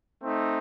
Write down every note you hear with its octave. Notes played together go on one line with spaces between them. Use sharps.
A3 C4 D#4